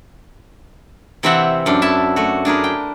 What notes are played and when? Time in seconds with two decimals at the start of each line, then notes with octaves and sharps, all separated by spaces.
1.23 C3 E3 C4 D5 E5 F#5
1.66 F#2 D4
1.82 E4 E5 A5
2.16 A3 F#4
2.45 D4 G#4 A#4 B4
2.64 G5